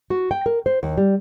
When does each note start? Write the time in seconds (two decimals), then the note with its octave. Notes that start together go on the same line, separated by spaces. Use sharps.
0.10 F#4
0.31 G5
0.46 A#4
0.66 C5
0.83 D#2
0.97 G3